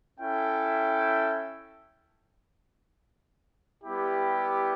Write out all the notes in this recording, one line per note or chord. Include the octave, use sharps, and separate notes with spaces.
C#4 E4 A4 E5 G5
G3 B3 E4 G4